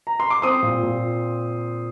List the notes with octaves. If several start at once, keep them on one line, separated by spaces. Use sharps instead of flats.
A#5
C6
D6
C4 C6 D#6
A#2
A#2